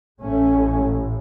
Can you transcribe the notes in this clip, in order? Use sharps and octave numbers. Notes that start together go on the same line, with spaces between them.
A1 A2 A3 C#4